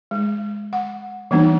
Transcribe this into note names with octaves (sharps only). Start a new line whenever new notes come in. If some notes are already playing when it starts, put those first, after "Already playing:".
G#3
F#5
E3 G3 A#3 B3 D4 D#4